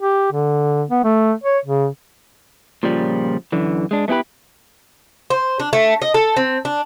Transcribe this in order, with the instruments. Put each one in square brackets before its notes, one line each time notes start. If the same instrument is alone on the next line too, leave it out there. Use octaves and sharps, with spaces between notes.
[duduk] G4
D3
B3
A3
C#5
C#3
[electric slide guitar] A#2 C#3 F3 G3
F#2 D3 E3
G#3 D4
A3 B3 E4 G4 B4
[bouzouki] C5
D4
A3
D#5
A4
C4
D4